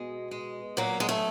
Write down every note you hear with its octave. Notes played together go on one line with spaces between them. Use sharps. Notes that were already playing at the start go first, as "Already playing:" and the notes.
Already playing: B2 G#3
G#3
A#2 F#3 A#3
G#3
A3